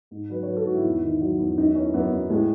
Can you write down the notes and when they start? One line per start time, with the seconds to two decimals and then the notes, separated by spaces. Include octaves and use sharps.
0.11 G#2
0.30 F#3 B4
0.43 C#5
0.48 F#3 B4
0.57 A4
0.67 G#2 F#4
0.75 E4
0.85 E2
1.03 D#3
1.21 F#3
1.39 E2
1.58 F#2 D#4
1.75 E3 C#4
1.94 F#2 B3
2.12 F#2
2.30 A2 G#3